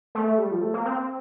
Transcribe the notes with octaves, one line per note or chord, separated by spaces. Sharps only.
A3
G3
F3
A3
A#3
C4